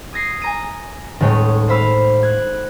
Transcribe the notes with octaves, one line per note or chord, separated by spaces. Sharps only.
D#6 G#6 A#6 C7
G#5 A#5 D#7
D#1 A2 G#3 A3 C#5 D#5
C5 F5 B5 E6
F#6 G#6